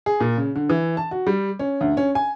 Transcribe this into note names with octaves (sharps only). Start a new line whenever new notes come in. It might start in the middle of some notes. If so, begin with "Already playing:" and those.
G#4
A#2
C#3
D3
E3
A5
F#4
G3
C#4
D2
C#4
G#5